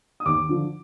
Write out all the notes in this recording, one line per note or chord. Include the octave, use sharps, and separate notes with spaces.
D#6
D#2 D6
D3 F3